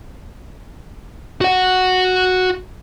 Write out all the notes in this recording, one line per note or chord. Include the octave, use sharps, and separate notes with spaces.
F#4 F#5